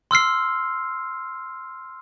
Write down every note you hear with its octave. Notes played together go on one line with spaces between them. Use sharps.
C6 E6 F6 C7